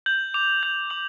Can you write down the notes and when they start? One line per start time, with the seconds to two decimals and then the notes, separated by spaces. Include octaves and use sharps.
0.06 G6 F#7
0.34 D6 F7
0.63 G6 F7
0.90 D6 F#7